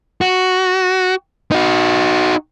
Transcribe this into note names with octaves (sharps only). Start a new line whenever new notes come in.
F#4
D#4 F#4